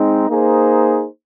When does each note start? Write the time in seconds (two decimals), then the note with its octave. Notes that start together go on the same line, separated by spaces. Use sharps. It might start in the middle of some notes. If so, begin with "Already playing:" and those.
Already playing: G#3 C4 D#4
0.30 A#3 D#4 G#4 C5